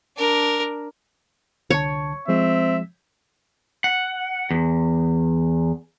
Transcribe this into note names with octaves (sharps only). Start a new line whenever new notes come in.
D4 A#4
C2 D3 C#5 A5
F3 G#3 C4 E5
F#5
E2